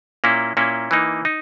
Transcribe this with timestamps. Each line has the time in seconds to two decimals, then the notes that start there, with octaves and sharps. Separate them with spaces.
0.24 A#2 A#3 C#4 E4
0.57 A#2 A#3 C#4 E4
0.91 E3 A#3 D#4
1.25 D#4